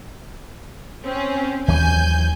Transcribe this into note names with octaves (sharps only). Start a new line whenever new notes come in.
C4 C#4
D#2 E3 F#3 G#5 G6